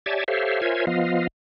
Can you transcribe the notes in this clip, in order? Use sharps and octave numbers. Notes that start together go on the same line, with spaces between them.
G4 C#5 D5 E5 G#5 A5
G4 A4 C5 C#5 E5 F5
F4 A#4 C5 C#5 E5 G#5
F3 B3 F4 D#5 F5